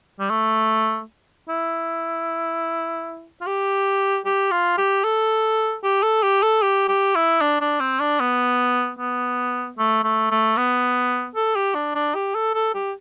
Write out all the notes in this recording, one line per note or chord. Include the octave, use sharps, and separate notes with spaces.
G3
A3
E4
F4
G4
G4
F4
G4
A4
G4
A4
G4
A4
G4
G4
E4
D4
D4
C4
D4
B3
B3
A3
A3
A3
B3
A4
G4
D4
D4
G4
A4
A4
G4